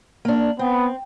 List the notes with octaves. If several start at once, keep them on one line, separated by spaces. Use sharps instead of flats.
A#3 D4
B3 C4